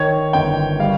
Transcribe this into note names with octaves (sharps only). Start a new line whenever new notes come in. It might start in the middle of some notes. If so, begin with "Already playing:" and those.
Already playing: D#3 C#5
G1 G5
G3 F5